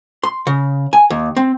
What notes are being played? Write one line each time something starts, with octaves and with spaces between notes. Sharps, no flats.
C6
C#3
G#5
D#2
C4